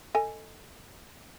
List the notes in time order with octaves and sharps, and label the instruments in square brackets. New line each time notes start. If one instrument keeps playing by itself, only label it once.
[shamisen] A4 D#5 G#5